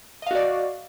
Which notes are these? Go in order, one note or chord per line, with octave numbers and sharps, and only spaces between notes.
F#4 D5 D#5 F5